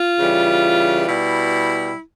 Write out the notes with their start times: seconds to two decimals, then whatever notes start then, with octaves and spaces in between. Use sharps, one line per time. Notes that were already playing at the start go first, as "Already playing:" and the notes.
Already playing: F4
0.19 C#3 E3 G3
1.07 B2 G3 E4